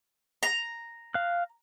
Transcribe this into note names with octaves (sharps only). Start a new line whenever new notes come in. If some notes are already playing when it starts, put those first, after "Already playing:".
A#5
F5 F6 F#6